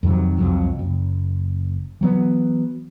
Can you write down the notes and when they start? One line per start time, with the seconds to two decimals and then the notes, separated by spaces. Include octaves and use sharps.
0.03 F2 C3 D#3 F#3
0.38 C2 F2 F#3
0.79 F#1
2.01 E3 F#3 B3